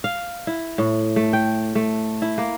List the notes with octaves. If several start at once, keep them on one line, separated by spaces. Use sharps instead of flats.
F5
E4
A2
A3
G5
A3
E4
A#3